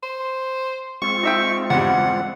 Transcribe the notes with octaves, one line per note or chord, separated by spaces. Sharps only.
C5
G#3 C4 F4 C#6
D#4 E5 G5
E2 G2 F#5